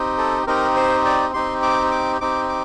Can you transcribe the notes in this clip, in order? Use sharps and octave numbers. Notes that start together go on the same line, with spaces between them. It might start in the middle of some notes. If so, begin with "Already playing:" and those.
Already playing: C4 D#4 G4
A4
C4 D#4 G4 A#4
C5
D5
C4 D#4 G4 C6
D6
D6
C4 D#4 G4 D6
D6